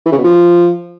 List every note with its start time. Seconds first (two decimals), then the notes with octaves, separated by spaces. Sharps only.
0.06 E3
0.12 C#3
0.18 B2
0.24 F3